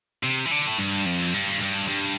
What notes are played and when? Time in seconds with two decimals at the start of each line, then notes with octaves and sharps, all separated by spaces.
0.23 C3
0.46 E3
0.51 D3
0.67 A2
0.78 G2
1.06 F2
1.34 G2
1.61 G2
1.88 G2